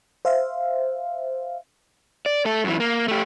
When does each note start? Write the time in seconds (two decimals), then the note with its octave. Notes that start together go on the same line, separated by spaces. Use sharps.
0.25 C5 E5 F5
2.26 D5
2.45 A3 A4
2.64 F#2 E3
2.80 A#3
3.08 A3 G4